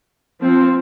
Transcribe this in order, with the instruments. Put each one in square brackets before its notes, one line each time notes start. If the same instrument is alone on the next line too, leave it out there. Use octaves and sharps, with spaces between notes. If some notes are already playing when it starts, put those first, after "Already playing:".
[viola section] F3 C4